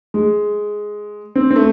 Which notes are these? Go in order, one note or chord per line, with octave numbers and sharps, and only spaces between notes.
G#3
C4
C4
A3